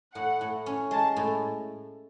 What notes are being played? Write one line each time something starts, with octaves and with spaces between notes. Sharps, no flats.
A2 F#5
A2
C#4
G#3 A5
A2